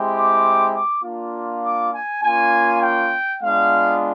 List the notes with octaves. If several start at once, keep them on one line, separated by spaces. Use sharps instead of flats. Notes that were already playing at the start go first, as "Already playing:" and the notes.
Already playing: G#3 C4 E4 G4
D6
D6
A#3 D4 F4
D6
G#5
A#3 C#4 F4 G#5
G5
G#3 B3 D4 F4 F5